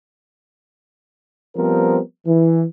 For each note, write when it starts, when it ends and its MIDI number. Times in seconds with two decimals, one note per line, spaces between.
1.56 1.99 53
1.56 1.99 55
1.56 1.99 59
1.56 1.99 60
1.56 1.99 70
2.26 2.64 52